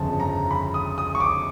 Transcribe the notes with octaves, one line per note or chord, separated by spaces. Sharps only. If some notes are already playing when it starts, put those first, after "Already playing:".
Already playing: G1 F2 C#3 A5
A#5
B5
D#6
D#6
C#6
D6